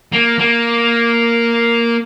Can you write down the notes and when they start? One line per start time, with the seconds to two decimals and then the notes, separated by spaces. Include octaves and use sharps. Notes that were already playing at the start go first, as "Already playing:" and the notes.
0.13 A#3
0.39 A#3